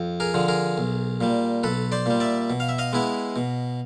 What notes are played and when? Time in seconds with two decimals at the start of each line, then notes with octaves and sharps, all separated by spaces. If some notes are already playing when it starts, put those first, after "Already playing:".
Already playing: F2
0.20 G#4 A#4
0.34 D3 F3
0.48 G#4 A#4
0.78 B1
1.21 A#2 G3
1.63 B1 A4 B4
1.92 C5 D5
2.06 A#2 G3
2.20 D5 E5
2.50 B2
2.60 F5
2.69 E5
2.78 D#5 F5
2.93 G#3 B3 E4
3.36 B2